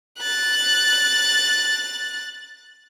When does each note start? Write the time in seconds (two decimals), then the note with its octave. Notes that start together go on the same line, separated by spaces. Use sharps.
0.20 F#6 A6